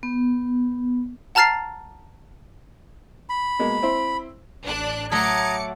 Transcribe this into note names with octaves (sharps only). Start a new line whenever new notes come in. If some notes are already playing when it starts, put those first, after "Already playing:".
B3
F#5 A5 A#5 F6 A6 C7
B5
B2 G#3 A#3
C4 E4 C5
A1 D4 F#6
F#3 A3 A4 A#5 D6 D#6 G#6 C#7